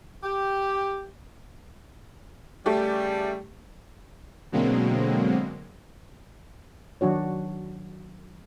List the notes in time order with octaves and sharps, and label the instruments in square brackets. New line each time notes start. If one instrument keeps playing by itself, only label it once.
[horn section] G4
[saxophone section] C#3 G3 [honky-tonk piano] A3 G4
[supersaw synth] B2 D3 F#3 G#3 A#3 C4
[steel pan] D#3 F#3 D4 F#4 C#5